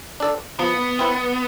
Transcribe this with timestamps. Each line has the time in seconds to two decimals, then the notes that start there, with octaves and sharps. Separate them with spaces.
0.20 D4 A4 D5
0.59 F3 B3
0.99 C4 E4 B4